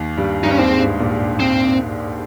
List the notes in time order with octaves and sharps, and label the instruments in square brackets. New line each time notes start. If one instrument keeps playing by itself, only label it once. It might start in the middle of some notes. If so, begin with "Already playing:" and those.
Already playing: [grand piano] D#2 D#3
G2 G3
[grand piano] G2 G3 [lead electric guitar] D#4
[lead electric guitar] C#4
[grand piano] D#2 D#3 [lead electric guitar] C4
[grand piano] G#2
G2
G#2
A#1 A#2
[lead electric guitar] C4